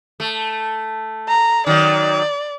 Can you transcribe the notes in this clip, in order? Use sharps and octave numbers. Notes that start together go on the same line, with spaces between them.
A3
A#5
D#3 F#3 D5